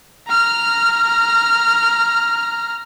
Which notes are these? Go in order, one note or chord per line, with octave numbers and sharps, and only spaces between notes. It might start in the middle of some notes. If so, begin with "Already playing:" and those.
A#5 F6